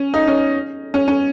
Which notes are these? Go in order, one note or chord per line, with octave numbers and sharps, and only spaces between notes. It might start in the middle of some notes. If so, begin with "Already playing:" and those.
Already playing: C#4
D#4
C#4
C#4
C#4